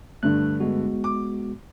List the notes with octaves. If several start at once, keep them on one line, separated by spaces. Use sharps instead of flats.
G2 D3 A3 F#6
G#3 B3 F#4
D6